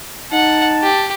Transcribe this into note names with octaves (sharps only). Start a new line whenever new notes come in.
D#4 F#5 A5
G4